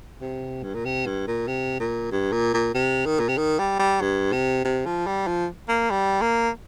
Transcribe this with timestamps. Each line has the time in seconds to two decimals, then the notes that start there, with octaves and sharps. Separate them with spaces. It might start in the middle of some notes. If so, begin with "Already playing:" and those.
0.21 C3
0.63 G2
0.74 A#2
0.85 C3
1.06 G2
1.27 A#2
1.47 C3
1.79 A#2
2.11 G2
2.32 A#2
2.54 A#2
2.74 C3
3.06 D#3
3.19 A#2
3.29 C3
3.37 D#3
3.59 G3
3.79 G3
4.01 G2
4.32 C3
4.64 C3
4.86 F3
5.07 G3
5.27 F3
5.69 A#3
5.90 G3
6.21 A#3